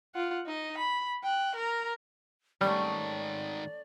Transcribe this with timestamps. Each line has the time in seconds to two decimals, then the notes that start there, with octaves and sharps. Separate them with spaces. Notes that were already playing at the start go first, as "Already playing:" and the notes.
0.15 F4 F#5
0.46 D#4 D#5
0.78 B5
1.23 G5 F#6
1.55 A#4 A#5
2.61 G#2 D#3 G3 A3 C#4 D5